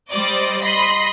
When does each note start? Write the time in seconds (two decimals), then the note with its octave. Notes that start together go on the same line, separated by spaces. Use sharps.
0.11 G3 C5 D5 D#5
0.62 D#5 B5 C6